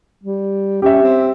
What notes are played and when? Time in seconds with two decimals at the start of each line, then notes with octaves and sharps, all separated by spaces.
0.24 G3
0.82 C#4 G4 E5
1.03 C4